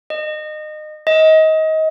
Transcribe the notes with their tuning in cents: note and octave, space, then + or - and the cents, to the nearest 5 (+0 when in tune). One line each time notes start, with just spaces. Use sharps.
D#5 -25
D#5 +25